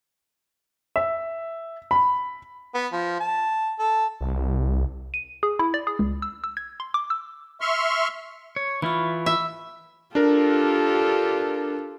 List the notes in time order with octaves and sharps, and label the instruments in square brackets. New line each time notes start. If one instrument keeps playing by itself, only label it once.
[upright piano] E5
B5
[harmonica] B3
F3
A5
A4
[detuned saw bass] C2
[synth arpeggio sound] D#7
G#4
E4
D5
G#4
C#2
E6
E6
G#6
C6
D6
E6
[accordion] E5 C6 C#6 F6
[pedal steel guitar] C#5
[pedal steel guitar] E3 E4 F4 [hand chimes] B5 C#6
[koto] E5
[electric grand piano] D4 A#4 [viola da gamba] F4 G4 A4